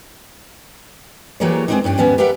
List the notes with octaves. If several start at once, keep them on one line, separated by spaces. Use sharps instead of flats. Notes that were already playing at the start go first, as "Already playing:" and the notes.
E3 F#3 G3 A#3 G#4 C#5
G3 G#3 B3 C4 D4 D#4
G2 C#4 D4 G5
D#2 G#2 G3 B3 C#4
G4 A#4 B4 D5 E5 F#5